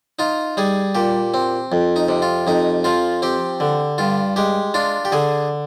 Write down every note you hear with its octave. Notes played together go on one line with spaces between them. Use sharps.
D#4 F4
G3 G#4
A#2 G4
C4
F2
D#4
C3
F4
F2 D#4
F3 F4
C4 G4
D3
G2 F4
G#3 G4
D4 F4
G4
D3 G#4